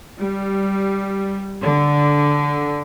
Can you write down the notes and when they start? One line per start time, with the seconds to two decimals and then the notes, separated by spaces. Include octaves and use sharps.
0.19 G3
1.61 D3